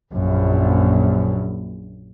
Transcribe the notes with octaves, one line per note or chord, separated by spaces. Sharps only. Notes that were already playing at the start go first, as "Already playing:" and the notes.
A#1 F#2